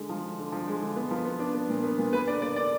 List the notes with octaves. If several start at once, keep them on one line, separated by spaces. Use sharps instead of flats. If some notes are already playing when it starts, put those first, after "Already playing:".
Already playing: D3 G#3
F3
D3
D3
F3
G#3
D3
B3
F3
B3
D4
B3
A#2
B3
A#2
A#3 B4
D3 D5
A#3 D5
D3 D5